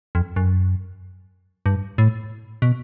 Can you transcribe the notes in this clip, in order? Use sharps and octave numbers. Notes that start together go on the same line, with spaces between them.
F2
F#2
G2
A2
B2